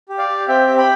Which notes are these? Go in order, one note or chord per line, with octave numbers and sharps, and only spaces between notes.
G4
D5 F5
G4
C4 E5 G5
G4
G5 B5